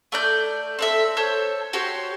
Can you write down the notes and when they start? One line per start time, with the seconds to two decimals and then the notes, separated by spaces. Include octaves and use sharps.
0.12 A3 D5 G6
0.79 C4 A4 E5
1.17 A4 C5 C#5
1.73 F#4 G4 C5 C#5